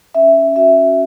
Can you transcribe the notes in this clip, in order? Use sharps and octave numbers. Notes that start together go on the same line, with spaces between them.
C#4 E5
F#4 E5